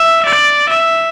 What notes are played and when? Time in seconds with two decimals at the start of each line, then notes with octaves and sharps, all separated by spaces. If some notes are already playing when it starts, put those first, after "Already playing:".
Already playing: E5
0.26 D5
0.69 E5